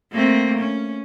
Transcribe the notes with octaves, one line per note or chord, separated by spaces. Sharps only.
A3 A#3 C4
C#4